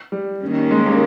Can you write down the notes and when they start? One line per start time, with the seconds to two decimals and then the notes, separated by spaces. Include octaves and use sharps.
0.12 G3
0.42 D#2 D#3 G3 C#4
0.71 G#3
0.86 A#3